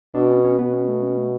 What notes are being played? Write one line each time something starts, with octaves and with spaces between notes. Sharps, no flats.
B2 D4
C#4
C#4
B2 B3
C#4
A3
C#4
A3